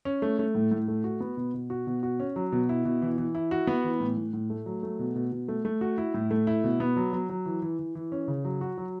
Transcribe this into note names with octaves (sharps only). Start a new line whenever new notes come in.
C#4
A3
A3
A2
A2
A3
F#4
B3
B2
B2
F#4
B2
F#4
C#4
F#3
B2
E4
B2
E3
E3
E4
F#4
B3
E3
A2
A2
A2
A3
F#3
A3
B2
B2
B2
A3
A3
F#4
E4
A2
A3
E4
B2
B3
F#3
F#3
F#3
E3
E3
E3
E3
C#4
C#3
F#3
F#4
F#3